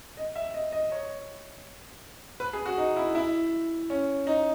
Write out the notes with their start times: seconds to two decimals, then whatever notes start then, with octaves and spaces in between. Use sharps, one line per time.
0.17 D#5
0.36 E5
0.54 D#5
0.73 D#5
0.92 C#5
2.40 B4
2.53 G#4
2.66 F#4
2.78 D#4
2.96 E4
3.15 E4
3.90 C#4
4.27 D#4